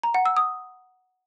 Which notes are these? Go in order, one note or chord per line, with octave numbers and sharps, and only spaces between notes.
A#5
F#5
E6
D#6